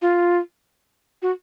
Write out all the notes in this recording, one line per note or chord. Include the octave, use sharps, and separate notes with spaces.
F4
F#4